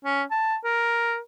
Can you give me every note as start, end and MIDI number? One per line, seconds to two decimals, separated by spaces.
0.05 0.23 61
0.31 0.57 81
0.64 1.18 70